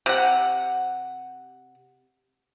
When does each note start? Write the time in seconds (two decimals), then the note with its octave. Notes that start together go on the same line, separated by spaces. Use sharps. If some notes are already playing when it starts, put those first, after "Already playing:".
0.06 C3 F#5